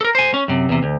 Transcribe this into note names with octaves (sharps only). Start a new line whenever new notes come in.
A4 A#4
C5 G#5
C#4
F#2 C3
E2 C3
D2